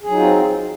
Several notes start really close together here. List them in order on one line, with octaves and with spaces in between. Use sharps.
G#4 F#3 D#4 F4 C4